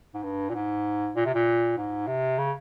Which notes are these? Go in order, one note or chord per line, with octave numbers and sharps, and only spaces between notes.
G#2
G2
A#2
G#2
A#2
C3
A#2
G#2
C3
C#3